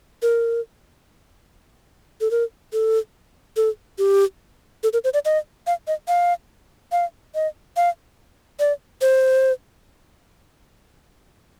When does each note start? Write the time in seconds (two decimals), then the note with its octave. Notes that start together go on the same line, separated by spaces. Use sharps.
0.22 A#4
2.21 A4
2.31 A#4
2.73 A4
3.56 A4
3.98 G4
4.83 A4
4.93 A#4
5.04 C5
5.14 D5
5.25 D#5
5.67 F5
5.87 D#5
6.08 F5
6.92 F5
7.35 D#5
7.77 F5
8.60 D5
9.02 C5